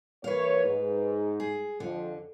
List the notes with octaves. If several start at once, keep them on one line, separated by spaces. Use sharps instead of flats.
E3 A#3 B4 C#5 F5
G#2
G#4
F2 D3 F3